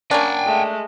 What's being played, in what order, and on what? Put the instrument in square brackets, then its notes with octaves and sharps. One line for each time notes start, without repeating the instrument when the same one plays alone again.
[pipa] A#3 C#4 D4 [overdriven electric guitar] G5 G#5
[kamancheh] G#3 A3